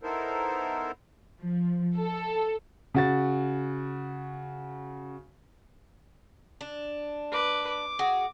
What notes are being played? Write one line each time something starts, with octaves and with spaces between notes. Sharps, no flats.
B3 D#4 E4 A4 A#4 C5
F3
A4
C#3 F#4 A6
D4
B4 D6
D6
F#4 G#4